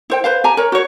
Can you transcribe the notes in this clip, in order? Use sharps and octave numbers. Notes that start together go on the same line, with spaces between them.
E4 C5 G5
B4 C5 F5
G4 G#5 A#5
A#4 C#5
F#4 C#5